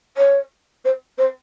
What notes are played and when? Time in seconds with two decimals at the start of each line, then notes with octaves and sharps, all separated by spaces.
0.17 C#5
0.84 C5
1.18 C5